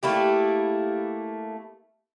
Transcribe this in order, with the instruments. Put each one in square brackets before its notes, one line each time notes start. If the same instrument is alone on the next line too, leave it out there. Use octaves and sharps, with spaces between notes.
[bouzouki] A3 A#3 E4 G4